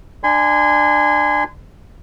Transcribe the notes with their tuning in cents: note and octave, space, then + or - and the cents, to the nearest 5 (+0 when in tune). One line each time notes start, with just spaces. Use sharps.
D4 +25 G#5 -10 C6 -35